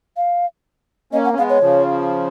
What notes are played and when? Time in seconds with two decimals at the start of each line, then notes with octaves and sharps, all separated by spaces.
0.17 F5
1.13 A#3 C#4 D#5
1.25 F#5
1.33 C#4
1.36 G#3 B3 F5
1.50 C#5
1.61 C#3 F3